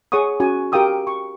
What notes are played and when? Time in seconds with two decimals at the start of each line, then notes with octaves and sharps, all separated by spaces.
0.12 G#4 C#5 F#5 C#6 D#6
0.40 C#4 F#4 G#5
0.72 G4 A#4 F5 G5 D#6 E6
1.07 C#6